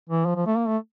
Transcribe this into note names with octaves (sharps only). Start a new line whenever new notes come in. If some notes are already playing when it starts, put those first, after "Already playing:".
E3
F3
F3
A3
A#3
A3